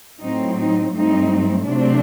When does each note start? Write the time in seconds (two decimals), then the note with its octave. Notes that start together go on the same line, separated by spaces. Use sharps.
0.21 A2 F#3 C4 D#4
0.58 D#4
0.93 G2 F#3 A3 C4 D#4
1.66 C3 F#3 A3 C4 D4